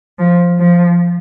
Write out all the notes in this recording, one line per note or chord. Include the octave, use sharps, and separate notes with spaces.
F3
F3